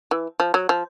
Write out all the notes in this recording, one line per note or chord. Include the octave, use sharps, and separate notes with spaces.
E3
F3
F#3
F3